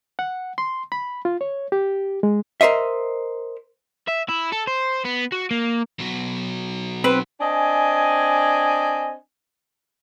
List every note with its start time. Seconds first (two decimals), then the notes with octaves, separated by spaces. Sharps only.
0.19 F#5
0.58 C6
0.92 B5
1.25 F4
1.41 C#5
1.72 G4
2.23 G#3
2.61 A#4 C5 D#5 E5
4.08 E5
4.29 E4
4.52 A4
4.67 C5
5.05 B3
5.32 F#4
5.51 A#3
6.00 B2 F#3
7.04 C4 B4
7.40 C4 D4 D#5 G#5